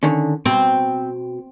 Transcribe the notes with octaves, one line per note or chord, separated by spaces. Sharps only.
D3 D#3 C#4
B2 C4